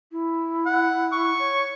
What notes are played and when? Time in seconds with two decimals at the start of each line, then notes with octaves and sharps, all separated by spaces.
0.12 E4
0.66 F#5
1.12 C#6
1.39 C#5